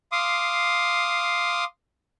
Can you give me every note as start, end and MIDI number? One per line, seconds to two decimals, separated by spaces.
0.12 1.64 77
0.12 1.64 84
0.12 1.64 86
0.12 1.64 87